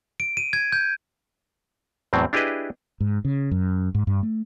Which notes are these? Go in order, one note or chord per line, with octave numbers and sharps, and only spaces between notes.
D7
D#7
G#6
G6
E2 A2 F#3 C4
D4 E4 G4 G#4 B4 D#5
G#2
C#3
F#2
G#2
G2
A3